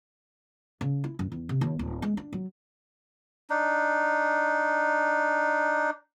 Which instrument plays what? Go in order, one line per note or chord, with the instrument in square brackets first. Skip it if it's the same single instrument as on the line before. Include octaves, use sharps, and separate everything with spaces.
[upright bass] C#3
E4
F#2
E2
C3
D#2
D1
G#3
D4
F#3
[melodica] D4 D#4